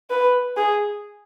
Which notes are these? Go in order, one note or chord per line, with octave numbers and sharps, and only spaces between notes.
B4
G#4